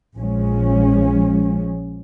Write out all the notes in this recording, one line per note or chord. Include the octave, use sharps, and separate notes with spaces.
A#1 F3 G#3 C#4